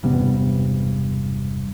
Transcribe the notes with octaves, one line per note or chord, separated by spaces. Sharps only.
E1 G2 C3 B3